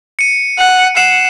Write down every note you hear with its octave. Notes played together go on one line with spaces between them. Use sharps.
C#7 D#7
F#5
F#5 C7 E7